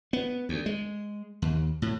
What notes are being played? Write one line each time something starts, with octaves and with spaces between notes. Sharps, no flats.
B3
D2
G#3
D#2
A2